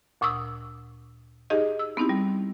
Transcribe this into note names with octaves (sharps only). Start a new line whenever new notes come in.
D2 A#2 C#6 D#6 E6
D#4 G4 G#4 D#5
E6
B3 C4 D#4 E4 G4
G3